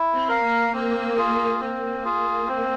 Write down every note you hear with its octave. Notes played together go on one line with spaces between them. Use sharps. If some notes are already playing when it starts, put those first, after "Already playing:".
Already playing: E4
C4
A#4 F5
A#3
A#3 C4
F4 G#4
A#3 C4
F4 G#4
C4